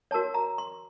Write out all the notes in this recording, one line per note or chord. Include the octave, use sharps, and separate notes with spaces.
F#4 A#4 C#5 A5
A#5
C6